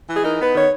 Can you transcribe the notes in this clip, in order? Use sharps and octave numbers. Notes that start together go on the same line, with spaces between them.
E3
G#4
D#4 A#4
B3 B4
D#3 C#5